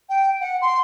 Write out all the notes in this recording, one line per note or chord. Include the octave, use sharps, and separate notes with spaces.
G5
F#5
C6